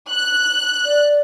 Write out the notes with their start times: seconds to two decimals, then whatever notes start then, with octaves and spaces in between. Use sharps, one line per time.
0.10 F#6
0.86 D5